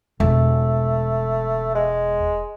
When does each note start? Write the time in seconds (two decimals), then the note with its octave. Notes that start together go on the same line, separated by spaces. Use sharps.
0.20 E1 A3
1.75 G#3